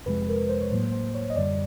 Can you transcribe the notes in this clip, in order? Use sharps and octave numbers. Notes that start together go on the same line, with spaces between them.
F2 C3 F3 G#3 B4
A#4
C5
C#5
A2 F#3 A#3 C5
C5
C#5
D#5
F#2 D3 G3 D5